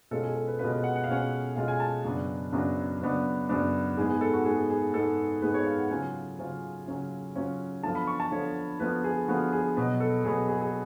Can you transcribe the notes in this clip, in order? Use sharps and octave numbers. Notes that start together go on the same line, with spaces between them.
B2 G#3 C#4 F4 A4
G#4
A4
B4
B2 G#3 C#4 F4 B4
B4
F#5
F#5
F5
B2 G#3 C#4 F4 F#5
B2 G#3 C#4 F4 F5
G#5
A5
F#2 C#3 F#3 B3 D4
F#2 C#3 F#3 B3 D4
F#2 C#3 F#3 B3 D4
F#2 C#3 F#3 B3 D4
G#2 G#3 B3 G#4
G#4
A4
F#4
G#2 G#3 B3 G#4
G#4
G#2 G#3 B3 A4
G#2 G#3 B3 B4
C#5
F5
F#5
C#3 F#3 C#4 F4 G#5
C#3 F#3 C#4 F4
C#3 F#3 C#4 F4
C#3 F#3 C#4 F4
D3 F3 B3 F4 A5
B5
C#6
A5
D3 F3 B3 F4 C#5
D3 F3 B3 F4 B4
G#4
D3 F3 B3 F4 F#4
G#4
B2 F#3 B3 B4
A4
B2 F#3 B3 G#4
G#4
G#4